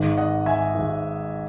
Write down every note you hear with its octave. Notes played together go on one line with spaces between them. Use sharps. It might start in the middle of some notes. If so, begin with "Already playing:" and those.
Already playing: G#1 G#2 D#3
D#5 F#5
E5 G#5
G#1 G#2 D#3